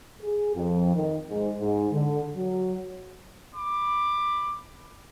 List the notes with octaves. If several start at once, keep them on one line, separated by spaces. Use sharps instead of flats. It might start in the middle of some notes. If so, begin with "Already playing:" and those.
G#4
F2
D#3
G#2
G#2
D3
F#3
B5 D6